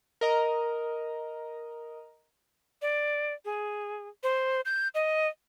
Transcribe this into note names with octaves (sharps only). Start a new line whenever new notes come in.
A#4 D#5 A#5
D5
G#4
C5
G6
D#5